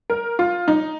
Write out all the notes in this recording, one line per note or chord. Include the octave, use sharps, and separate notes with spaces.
A#4
F4
D#4